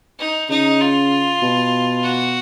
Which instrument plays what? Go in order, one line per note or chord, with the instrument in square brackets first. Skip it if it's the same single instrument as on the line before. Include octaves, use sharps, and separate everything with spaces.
[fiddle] D#4
[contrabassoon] C#3 [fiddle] D#4
[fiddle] F4
[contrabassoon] B2
[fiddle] F#4